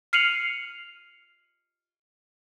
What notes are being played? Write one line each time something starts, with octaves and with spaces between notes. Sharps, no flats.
F6 C7 C#7 D#7 F7 F#7